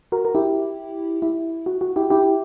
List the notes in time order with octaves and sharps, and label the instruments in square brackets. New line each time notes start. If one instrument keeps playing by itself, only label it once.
[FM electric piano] F#4 A#4
A#4
E4 G4
E4
F#4
F#4
E4 G4
E4 G4